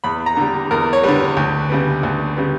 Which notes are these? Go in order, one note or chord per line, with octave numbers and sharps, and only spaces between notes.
E2 B5
A#5
D3 G3
E2 A#4
C#5
D3 G3 B4
D2
C#3 G3 B3
D2
C#3 G3 B3